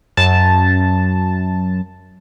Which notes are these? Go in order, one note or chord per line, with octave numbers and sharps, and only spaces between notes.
F#2 A5